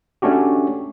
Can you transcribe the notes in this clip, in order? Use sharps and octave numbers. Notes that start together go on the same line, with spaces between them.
A3 C#4 D4 F#4 G4